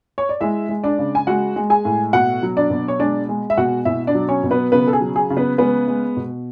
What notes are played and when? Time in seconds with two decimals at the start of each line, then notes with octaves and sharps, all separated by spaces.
0.18 C#5
0.29 D5
0.40 G#3 E4 E5
0.69 G#3
0.84 D4 D5
0.99 C#3
1.15 G#5
1.27 G#3 F#4 F#5
1.56 G#3
1.70 G#4 G#5
1.85 A2
2.13 B2 F#4 F#5
2.43 F#3
2.57 D4 D5
2.70 B2
2.88 C#5
3.00 G#3 D4 D5
3.29 G#3
3.50 E5
3.58 B2 F#4 F#5
3.85 B2 E4 E5
4.07 D4 D5
4.15 F#3
4.29 C#4 C#5
4.43 B2
4.51 B3 B4
4.72 C#3 B3 B4
4.87 A4
4.93 G#4
5.01 F#3
5.16 G#4
5.30 C#3
5.37 B3 B4
5.58 G#3 B3 B4
5.88 G#3
6.17 B2